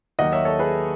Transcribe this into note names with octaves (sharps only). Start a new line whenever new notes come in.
D#2 D#3 F#3 D#5 F#5
C#5 E5
A4 C#5
G#4 B4